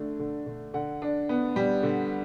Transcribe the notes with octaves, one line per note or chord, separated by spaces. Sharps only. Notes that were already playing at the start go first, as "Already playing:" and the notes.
Already playing: D3 A3 D4
D3
D3
D3 F#5
D4
B3
G3
D3